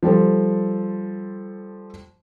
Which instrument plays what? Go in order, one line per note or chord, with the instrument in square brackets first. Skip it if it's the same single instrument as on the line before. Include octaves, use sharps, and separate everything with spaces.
[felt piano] F3 G3 A4 C5